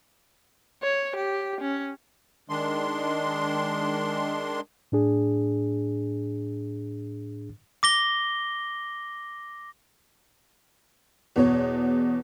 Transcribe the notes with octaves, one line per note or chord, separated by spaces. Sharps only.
C#5
G4
C#4
D#3 G#3 D4 C6
A2 D4 G#4
D6 A#6 G7
E2 B2 C#5